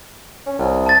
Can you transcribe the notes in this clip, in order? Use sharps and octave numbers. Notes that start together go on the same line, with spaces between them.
C#4
C2
A5 A6